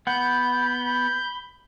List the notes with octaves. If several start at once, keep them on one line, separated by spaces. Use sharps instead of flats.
B3 F#5 B5 G6